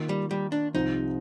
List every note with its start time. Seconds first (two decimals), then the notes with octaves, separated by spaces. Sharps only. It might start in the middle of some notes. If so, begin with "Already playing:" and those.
Already playing: D#3 A#3 F4
0.09 G3
0.31 G3
0.52 D4
0.74 C2 C3 F3 C4 D#4 F4